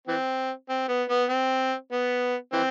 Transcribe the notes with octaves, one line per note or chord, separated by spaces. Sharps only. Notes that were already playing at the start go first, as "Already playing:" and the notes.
E3 C4
C4
B3
B3
C4
B3
E3 C4